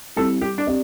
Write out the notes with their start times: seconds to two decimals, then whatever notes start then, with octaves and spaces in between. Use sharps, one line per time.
0.16 G3 C4 E4 A4
0.41 G3 G4
0.58 D4
0.67 C4 G4 D5